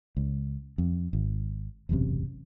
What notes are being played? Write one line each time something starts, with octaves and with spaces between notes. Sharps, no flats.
C#2
F2
G#1
E1 A1 F#2 C3